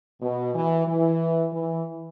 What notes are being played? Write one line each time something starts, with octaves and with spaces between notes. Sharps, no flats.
B2
E3
E3
E3